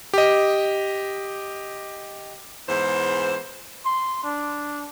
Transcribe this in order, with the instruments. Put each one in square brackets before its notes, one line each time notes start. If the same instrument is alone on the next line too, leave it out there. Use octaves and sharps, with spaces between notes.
[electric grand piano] G4 D#5
[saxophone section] E2 G#2 E3 C5
[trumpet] C6
D4